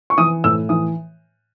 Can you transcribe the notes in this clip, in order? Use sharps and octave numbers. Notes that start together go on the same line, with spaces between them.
C#6
E3 D#6
A2 E6
E3 D#6